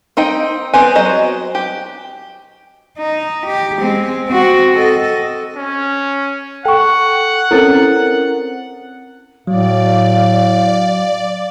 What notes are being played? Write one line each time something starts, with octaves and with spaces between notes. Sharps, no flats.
C4 D#4 D#5 G5
B3 C4 G#5
F#3 C5 D#5
G4
D#4
G4
G#3 C4
C4 F#4
A4 D#5
C#4
A4 F#5 G5 C#6
C4 C#4 E4 A4 A#4 A6
A2 F#3 D5 F5